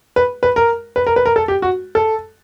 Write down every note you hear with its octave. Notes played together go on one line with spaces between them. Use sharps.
B4
B4
A#4
B4
A#4
B4
A#4
A4
G4
F#4
A4